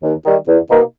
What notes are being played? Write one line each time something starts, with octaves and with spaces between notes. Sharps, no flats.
D#2
D#3 G3
E2
B2 A#3 D#4